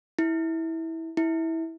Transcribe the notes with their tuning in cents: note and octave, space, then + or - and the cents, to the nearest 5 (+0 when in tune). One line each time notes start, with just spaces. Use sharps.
E4 -20
E4 -20